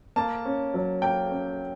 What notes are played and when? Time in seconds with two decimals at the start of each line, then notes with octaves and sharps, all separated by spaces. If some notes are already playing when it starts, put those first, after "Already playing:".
0.16 A#3 A5
0.45 C#4
0.74 F#3
1.02 A#3 G5
1.31 C#4